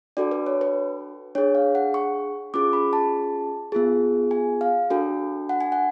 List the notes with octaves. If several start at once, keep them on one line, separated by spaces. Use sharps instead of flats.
D4 F#4 A4 D5
B4
C#5
B4
D4 G#4 C#5
F5
F#5
C#6
C#4 F4 G#4 D6
B5
A5
B3 F4 G#4
G#5
F5
D4 F#4 A4
F#5
G#5
F#5